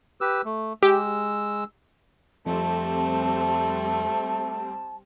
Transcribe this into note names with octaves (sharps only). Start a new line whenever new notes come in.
G4 B4 E6
A3
G#3 G4 E6
F2 G3 A3 C4 A5